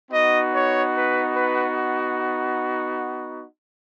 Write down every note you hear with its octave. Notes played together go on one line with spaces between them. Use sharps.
B3 D#4 F#4 D#5
C#5
B4
B4